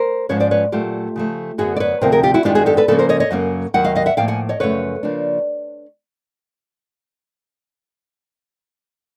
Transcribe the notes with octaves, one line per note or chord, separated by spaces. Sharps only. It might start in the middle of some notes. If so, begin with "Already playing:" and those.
Already playing: A#4 C5
G#2 F3 G#3 C#4 B4 C#5
C5 D5
B4 C#5
A#2 F#3 A3 F4 G4
C#3 F3 A3
F#2 D3 F#3 B3 F#4 G#4
D5
B4 C#5
D2 C3 F3 C4 A#4 C5
G#4 A#4
F4 G4
E4 F#4
F#2 D#3 G#3 B3 D4 F4 G4
F#4 G#4
G4 A4
A4 B4
C#3 F3 A#3 C#4 A4 B4
A#4 C5
C#5 D#5
C#5 D#5
F#2 C#3 F#3 A#3 C#4
D#2 D#3 F#3 F#5
D#5 F5
D#5 F5
E5 F#5
A2 F3 A#3 F5 G5
F#5 G#5
C#5 D#5
F#2 C#3 F3 A3 C#4 B4 C#5
C#3 F3 A#3 D4